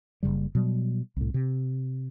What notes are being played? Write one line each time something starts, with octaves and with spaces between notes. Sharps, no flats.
F#1 C2 C#3 G3
B2 F#3 G3
C2 A2
C3